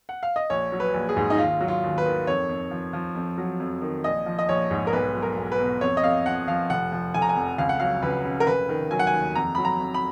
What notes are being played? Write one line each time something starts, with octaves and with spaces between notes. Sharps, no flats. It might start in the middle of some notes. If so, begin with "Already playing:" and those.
F#5
F5
D#5
A#1 C#5
F#3
B4
A#1
G#4
G#2
D#4
D#2 F4
F#3
F4
D#2
B4
D#3
F2 C#5
F2
F3
F3
F2
F#3
F2
D#3
A#1 D#5
F3
D#5
A#1 C#5
G#2
A#4
B1 B4
F#3
A#4
B1
B4
B2
F2 C#5
D#5
F2 F5
F3 F#5
F3 F5
F1 F#5
F3
F1 G#5
A#5
G#5
F2
C#2 F5
F#5
F#3 F5
C#2 B4
C#3
A#4
F1 B4
D#3
F#3 G#5
F#5
G#5
D#2
F2 A#5
F#3 B5
A#5
F2
B5